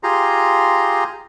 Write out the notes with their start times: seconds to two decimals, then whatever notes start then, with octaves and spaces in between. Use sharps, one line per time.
0.03 F4 G4 G#4 A#5 C6